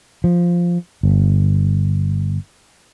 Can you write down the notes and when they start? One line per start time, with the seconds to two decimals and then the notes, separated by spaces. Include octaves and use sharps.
0.24 F3
1.03 G1